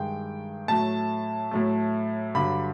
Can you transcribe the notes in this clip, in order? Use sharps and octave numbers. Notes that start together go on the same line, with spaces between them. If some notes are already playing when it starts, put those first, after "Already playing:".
Already playing: G2 D#3 G#3 G5
A2 F#3 A3 A5
A2 F#3 A3
G2 D3 F#3 B5